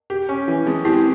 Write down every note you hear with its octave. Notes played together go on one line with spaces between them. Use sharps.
G4
C#4
E3
G#3 C4
C4 E4 G4